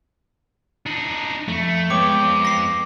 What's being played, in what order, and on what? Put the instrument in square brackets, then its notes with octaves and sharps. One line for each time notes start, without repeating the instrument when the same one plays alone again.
[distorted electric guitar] D4 D#4
[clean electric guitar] F2 [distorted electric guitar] A3
[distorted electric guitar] F2 G5 [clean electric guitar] G#3 B3 C#5 [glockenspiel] D6
[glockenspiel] A#6 C7